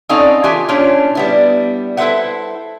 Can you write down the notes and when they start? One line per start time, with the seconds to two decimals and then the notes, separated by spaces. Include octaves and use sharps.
0.09 C4 C#4 D#4 A4 D5 F5
0.44 E3 F4 G4 E5 G#5
0.68 A#2 C#4 D4 E4 F4 C#5
1.15 G3 B3 E4
1.97 E4 A4 B4 C5 E5 F#5